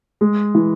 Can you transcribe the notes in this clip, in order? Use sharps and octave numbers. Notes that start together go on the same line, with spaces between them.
G#3
E3